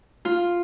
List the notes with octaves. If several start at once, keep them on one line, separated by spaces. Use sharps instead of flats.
F4